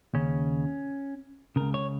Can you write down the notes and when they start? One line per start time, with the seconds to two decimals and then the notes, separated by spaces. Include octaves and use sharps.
0.14 D#2 C#3 C#4
1.56 C#2 C#3 A#4
1.74 C#5